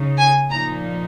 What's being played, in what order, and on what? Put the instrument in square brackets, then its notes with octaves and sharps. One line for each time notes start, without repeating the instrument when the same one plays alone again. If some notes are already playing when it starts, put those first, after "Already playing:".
Already playing: [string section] C#3 D#4
G#5
A#2 F3 A#3 D#4 A#5